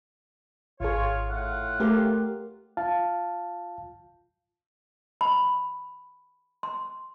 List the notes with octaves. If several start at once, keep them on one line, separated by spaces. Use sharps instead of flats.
G#1 F4 G#4 C#5
A2 F4 F#5
A3 G4 A#4
F4 F5 A5
B5
C6